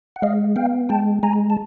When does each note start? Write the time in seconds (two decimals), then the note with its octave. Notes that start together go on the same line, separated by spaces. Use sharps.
0.16 F#5
0.22 G#3 D#5 F5
0.56 B3 F5 G5
0.89 G#3 G5 A5
1.23 G#3 G#5 A#5
1.50 A5